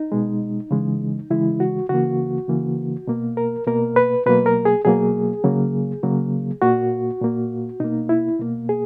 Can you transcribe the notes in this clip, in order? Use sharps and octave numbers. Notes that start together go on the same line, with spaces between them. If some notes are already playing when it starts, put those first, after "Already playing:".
Already playing: D#4
B2 G#3
C#3 E3 G#3
C#3 E3 G#3 E4
F#4
C#3 E3 A#3 F#4
C#3 E3 A#3
B2 A#3
A#4
B2 A#3 A#4
B4
B2 F#3 A#3 B4
A#4
G#4
B2 F#3 A#3 G#4
C#3 F#3 A#3
C#3 F#3 A#3
A#2 A#3 F#4
A#2 A#3
B2 A#3 D#4
E4
B2 A#3
G#4